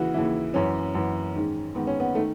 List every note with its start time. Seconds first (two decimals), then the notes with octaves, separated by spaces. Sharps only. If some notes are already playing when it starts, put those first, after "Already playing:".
Already playing: D#2 C#3 E3 E4 F#4
0.14 D#2 C#3 E3 E4
0.54 F#2 E3 C#4
0.95 F#2 E3
1.35 G#2 D#3
1.75 G#2 D#3 B3
1.87 C#4
2.00 B3
2.15 D#3 A3